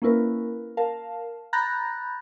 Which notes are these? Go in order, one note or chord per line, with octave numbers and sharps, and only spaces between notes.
A#3 C#4 E4 A#4 B4
A#4 F5 A5
A#5 B5 F#6 G6 A6 A#6